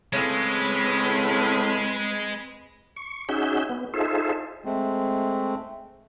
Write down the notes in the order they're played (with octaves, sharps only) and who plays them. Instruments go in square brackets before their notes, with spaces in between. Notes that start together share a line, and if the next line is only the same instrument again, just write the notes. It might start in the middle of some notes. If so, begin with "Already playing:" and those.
[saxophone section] A2 C#3 [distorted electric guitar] G#3 [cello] C4 B4
[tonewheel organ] C#6
C#4 D#4 F#4 G#4 E5 G6
B3
D#4 F4 G#4 A4 C5 E5
[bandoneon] G#3 A3 C4